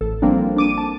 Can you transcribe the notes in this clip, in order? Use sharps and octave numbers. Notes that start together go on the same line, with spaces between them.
A1 A4
F3 G3 A#3 C4 D4
D4 D6 D#7
A5